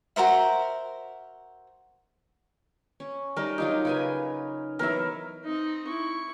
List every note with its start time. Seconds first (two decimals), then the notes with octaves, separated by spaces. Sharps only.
0.16 F#4 A#4 C5 E5
3.00 C#4
3.36 G3 D#4 A#4 D#5
3.58 F#3 D#4 F4 G4
3.85 C#3 B4 G#5
4.79 E3 F#3 B3 A#4 E5
5.45 C4 D#4
5.87 E4 C#6